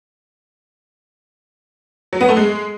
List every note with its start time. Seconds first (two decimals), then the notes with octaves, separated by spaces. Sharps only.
2.13 F#3
2.21 B3
2.29 A3
2.37 G#3